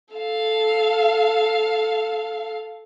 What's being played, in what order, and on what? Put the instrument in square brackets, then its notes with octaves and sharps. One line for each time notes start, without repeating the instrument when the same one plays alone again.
[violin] A4 F5